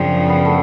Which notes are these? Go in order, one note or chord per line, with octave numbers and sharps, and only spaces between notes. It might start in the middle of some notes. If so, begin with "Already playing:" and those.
Already playing: F#2 C#3 F3 C4 D4
B3
A3